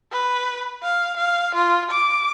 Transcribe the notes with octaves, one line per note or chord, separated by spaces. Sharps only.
B4
F5
F5
F4
D6